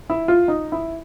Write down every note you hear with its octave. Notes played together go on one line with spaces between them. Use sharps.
E4
F4
D#4
E4